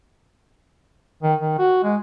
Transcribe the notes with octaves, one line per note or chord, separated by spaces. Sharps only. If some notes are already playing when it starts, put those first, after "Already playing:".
D#3
D#3
F#4
G#3